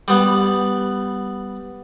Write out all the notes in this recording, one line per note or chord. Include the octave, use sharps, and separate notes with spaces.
G3 B3